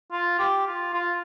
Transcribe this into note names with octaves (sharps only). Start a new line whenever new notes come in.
F4
G4
F4
F4